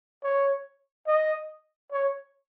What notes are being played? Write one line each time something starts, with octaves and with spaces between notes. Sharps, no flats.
C#5
D#5
C#5